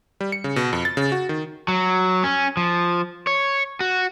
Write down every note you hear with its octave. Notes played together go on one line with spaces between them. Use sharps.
G3
C#7
C#3
B2
F2
A6
C#3
F#4
D#3
F#3
C#4
F3
C#5
F#4